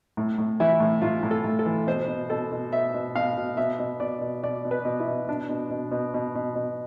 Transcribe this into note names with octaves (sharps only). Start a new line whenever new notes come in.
A2
A2
E3 E4
A2
A2 F4
A2
A4
A2
A4
E3
B2 C5
B2
B2 A4
B2
B2 E5
B2
B2 F5
B2
B2 E5
B2
B2 D5
B2
B2 D5
B2
B4
B2
E4
B2
B2 D4
B2
B2
B2
B2
B2
B2